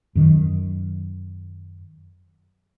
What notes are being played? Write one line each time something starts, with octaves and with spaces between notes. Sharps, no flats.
F#2 D#3